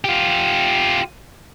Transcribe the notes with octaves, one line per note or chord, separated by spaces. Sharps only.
F4 G4